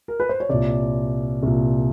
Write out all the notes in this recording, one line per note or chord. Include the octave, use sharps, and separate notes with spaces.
A#4
B4
C5
C#5
C2 A#2 D5
C2 A#2